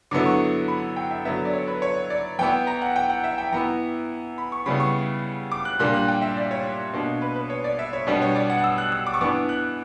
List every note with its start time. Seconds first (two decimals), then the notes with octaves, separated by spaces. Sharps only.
0.11 D3 F#3 B3 E4 D6
0.26 C#6
0.68 B5
0.96 G5
1.11 E5
1.25 D3 F#3 B3 E5
1.45 D5
1.53 C#5
1.68 B4
1.82 C#5
2.10 D5
2.39 E3 B3 E4 G5
2.67 A#5
2.81 F#5
2.96 G5
3.10 F#5
3.24 E5
3.38 G5
3.52 E3 B3 E4 A#5
4.38 B5
4.52 C#6
4.66 C#3 G3 B3 E4 B5
4.80 C#6
5.52 D6
5.65 F#6
5.79 A#2 G3 A#3 D4 F#6
5.94 F#6
6.08 G5
6.22 E5
6.37 D5
6.51 C#5
6.93 B2 A#3 D4
7.22 B4
7.36 B4
7.50 C#5
7.64 D5
7.79 E5
7.93 C#5
8.07 B2 G3 B3 D4 B4
8.21 C#5
8.36 D5
8.50 F#5
8.64 E6
8.78 F#6
8.92 E6
9.07 D6
9.14 C#6
9.21 E3 B3 D4 D6
9.49 F#6